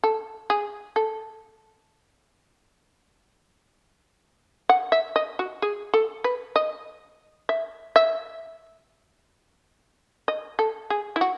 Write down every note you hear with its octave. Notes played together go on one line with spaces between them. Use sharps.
A4
G#4
A4
F#5
E5
D#5
F#4
G#4
A4
B4
D#5
E5
E5
D#5
A4
G#4
E4
F#4